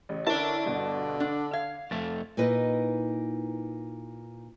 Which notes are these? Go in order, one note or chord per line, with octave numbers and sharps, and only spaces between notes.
A1 C#3
D3 C#4 E4 A#4 D5 A5
G2 B2 D3
D4
F5 G#6
F2 A3 A6
A#2 D#4 E4 B4 D#5